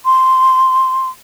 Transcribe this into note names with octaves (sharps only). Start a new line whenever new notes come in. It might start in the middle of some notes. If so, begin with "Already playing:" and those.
C6